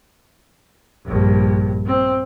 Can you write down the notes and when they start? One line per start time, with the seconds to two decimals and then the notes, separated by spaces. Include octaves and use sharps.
1.05 A#1 G2
1.86 C4